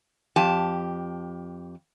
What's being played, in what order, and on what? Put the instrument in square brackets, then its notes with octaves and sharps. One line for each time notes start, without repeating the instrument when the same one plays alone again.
[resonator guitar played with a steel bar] F2 G4 A5